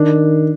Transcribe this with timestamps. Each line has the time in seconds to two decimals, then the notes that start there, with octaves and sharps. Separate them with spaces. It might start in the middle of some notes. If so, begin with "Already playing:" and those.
Already playing: D#3 D4